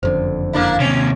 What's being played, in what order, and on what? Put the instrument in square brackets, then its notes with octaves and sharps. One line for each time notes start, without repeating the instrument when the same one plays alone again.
[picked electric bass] F#1 F2 D3 [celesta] C5
[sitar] A#3 D4 E4
[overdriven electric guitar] D#2 C3 [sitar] C#4